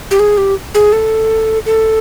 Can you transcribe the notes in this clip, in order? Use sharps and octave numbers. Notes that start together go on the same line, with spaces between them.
G4
G#4
G4
G#4
A4
A4